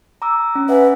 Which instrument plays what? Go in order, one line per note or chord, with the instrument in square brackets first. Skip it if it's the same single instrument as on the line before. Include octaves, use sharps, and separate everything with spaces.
[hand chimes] A#5 D6 E6
C#4
[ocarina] B4 [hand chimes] E5 F#5 G#5